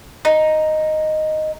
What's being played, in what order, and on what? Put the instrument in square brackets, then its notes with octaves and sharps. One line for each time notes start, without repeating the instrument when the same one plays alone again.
[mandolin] D#4